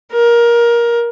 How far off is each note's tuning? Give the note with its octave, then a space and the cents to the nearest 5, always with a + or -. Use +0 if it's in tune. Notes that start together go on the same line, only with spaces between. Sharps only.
A#4 +20